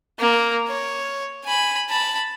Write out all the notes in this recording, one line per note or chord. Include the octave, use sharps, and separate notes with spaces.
A#3
C#5
G#5 B5
A5 B5